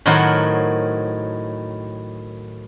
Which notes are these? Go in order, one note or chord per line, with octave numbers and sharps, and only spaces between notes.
A2 D#3 F#3 A#4 C5 F#5